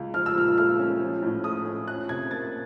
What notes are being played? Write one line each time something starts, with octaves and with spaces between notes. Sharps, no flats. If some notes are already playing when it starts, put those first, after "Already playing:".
Already playing: C#2
F3 F6
E6
A#2 F6
A3 F6
C#4
F3
A2
A3 D#6
C#4
F3 F#6
C3 G#6
A#3 A6